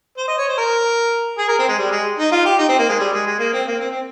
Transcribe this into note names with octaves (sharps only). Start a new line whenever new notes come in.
C5
D#5
C#5
C5
A#4
G#4
A#4
C4
G#3
G3
G#3
D#4
F4
G4
D#4
C4
A#3
G#3
G3
G#3
G#3
A#3
C4
A#3
C4
C4